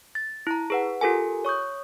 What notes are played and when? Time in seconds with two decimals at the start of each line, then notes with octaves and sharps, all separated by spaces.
0.15 A6
0.47 E4 A#5
0.70 G#4 B4 F#5
1.01 F4 G4 A4 A#4 G#5
1.45 C#5 C#6 D#6 G6